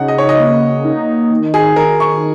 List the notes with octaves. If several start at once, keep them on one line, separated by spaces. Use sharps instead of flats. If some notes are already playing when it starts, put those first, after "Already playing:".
Already playing: C#3 D#4 F#5
D#5
C#5
D#5
A#3
D#4
D#3
G#4
D#3 A#4
C#6